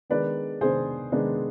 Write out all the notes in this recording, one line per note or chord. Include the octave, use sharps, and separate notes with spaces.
D#3 G#3 B3 D4 B4 D5
D#3 G#3 B3 D4 G#4 C5
D#3 G#3 B3 D4